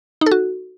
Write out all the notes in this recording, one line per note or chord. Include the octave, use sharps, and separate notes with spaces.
D#4
A4
F#4